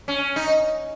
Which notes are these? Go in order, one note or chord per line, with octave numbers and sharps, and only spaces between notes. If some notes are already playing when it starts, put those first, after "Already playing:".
C#4
D#4